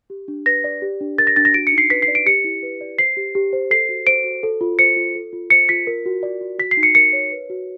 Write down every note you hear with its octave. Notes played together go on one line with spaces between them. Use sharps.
G4
D4
B4 A#6
D5
G4
D4
A#4 A6
A#6
D4 A6
A#6
F#4 D7
C#7
D#4
C7
B4 B6
C7
D5
D7
G4 C#7
E4
B4
D5
C5 C7
G4
G4
C5
A4 C7
F#4
C5 D7
F#4
A4
F4
C5 C#7
F4
A4
F4
C5 C#7
F4 B6
A#4
F#4
D5
F#4
F#4 B6
C7
D#4
C#7
A#4 C#7
C#5
B4
F#4